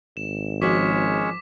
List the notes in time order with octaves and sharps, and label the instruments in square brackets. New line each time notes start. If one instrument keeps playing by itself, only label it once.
[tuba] G#1 [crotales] E7
[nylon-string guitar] F3 F#4 A#4 [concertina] G#3 C#4 C#5 [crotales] D6 B6